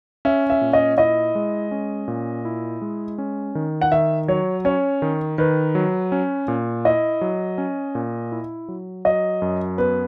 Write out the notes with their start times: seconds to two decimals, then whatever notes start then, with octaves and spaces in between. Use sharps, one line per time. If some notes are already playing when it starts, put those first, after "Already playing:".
0.25 C#4 E5
0.50 E5
0.61 A#2
0.73 D#5
0.98 E4 D#5
1.35 G#3
1.71 C#4
2.08 A#2
2.45 E4
2.82 G#3
3.18 C#4
3.55 D#3
3.81 F#5
3.92 D#3 E5
4.28 F#3 C#5
4.65 C#4 C#5
5.02 D#3
5.38 D#3 B4
5.75 F#3
6.12 C#4
6.48 A#2
6.85 E4 D#5
7.21 F#3
7.58 C#4
7.95 A#2
8.32 E4
8.68 F#3
9.05 F#3 D#5
9.42 F#2
9.78 B3 B4